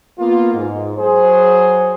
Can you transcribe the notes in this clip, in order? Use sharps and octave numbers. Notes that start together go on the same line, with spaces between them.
A#3 B3 F4
G#2
F#3 G#4 C5